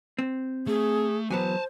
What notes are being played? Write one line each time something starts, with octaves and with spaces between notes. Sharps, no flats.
C4
A3 G#4
E2 F#3 B3 C5 G#5 A5